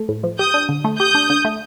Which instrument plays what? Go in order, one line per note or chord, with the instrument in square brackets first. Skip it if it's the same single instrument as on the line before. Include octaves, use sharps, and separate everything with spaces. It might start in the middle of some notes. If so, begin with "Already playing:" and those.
Already playing: [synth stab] A3
A2
F3
[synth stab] G4 [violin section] D#6 G6
[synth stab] D4
D3
A3
[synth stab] G4 [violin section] D#6 G6
[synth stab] D4
D3
A3